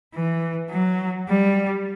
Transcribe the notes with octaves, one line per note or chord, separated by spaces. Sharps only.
E3
F#3
G3